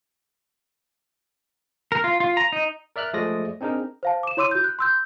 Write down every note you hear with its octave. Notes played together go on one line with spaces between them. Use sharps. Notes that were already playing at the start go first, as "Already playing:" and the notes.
A#4
F4
F4
A#5
D#4
A#4 D5 E5 F6 F#6
F3 G#3 A3 D5 D#6 A#6
C4 D4 D#4 G#4 A#4
C5 F5 A5
D6 E7
E4 C#5 C6 D6 E6 D#7
F#4 G6
F#6
C6 E6 G6